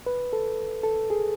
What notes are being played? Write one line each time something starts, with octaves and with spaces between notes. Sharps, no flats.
B4
A4
A4
G#4